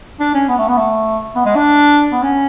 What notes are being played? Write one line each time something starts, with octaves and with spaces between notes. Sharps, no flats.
D4
C#4
B3
A3
B3
A3
B3
G#3
D4
B3
C#4